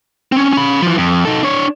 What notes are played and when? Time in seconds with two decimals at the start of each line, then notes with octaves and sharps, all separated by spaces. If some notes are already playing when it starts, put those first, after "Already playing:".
0.32 C4 C#4
0.53 C#4 B5
0.82 E3 F3
0.98 F2
1.25 D#4 A4
1.43 D4 C#5